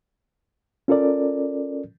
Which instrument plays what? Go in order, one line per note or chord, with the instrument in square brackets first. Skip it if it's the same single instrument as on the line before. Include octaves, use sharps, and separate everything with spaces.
[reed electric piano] C#4 F4 A4 A#4 D5